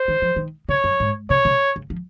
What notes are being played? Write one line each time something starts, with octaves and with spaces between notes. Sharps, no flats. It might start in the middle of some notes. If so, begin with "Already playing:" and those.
Already playing: C5
D#3
F3
D#3
C#3 C#5
F#2
G#2
C3 C#5
C3
C#3
F3